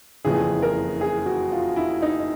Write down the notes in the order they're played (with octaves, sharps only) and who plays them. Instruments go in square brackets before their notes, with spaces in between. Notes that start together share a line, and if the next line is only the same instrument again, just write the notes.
[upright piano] F#1 F2 C#3 E3 G#4
A#4
G#4
F#4
F4
E4
D#4